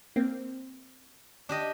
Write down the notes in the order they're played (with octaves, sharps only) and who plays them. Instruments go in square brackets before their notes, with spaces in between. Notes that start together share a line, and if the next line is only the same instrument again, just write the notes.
[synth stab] A#3 C4
[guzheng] D4 G4 D#5